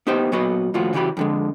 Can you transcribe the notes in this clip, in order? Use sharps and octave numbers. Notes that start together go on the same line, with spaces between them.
B3 D#4 G4 C5 G5
A#2 F#3 B3 F#4 B4 D#5
D#2 A2 F3 F4 F#4
C#3 E3 F#4 G4 B5
F2 D3 G#3